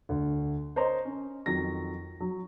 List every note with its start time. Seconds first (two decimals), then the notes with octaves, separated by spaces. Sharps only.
0.09 D2
0.76 A#4 C5 C#5 D#5 A#5 C6
1.05 C#4
1.46 F2 D#3 F#3 A#6
2.20 F#3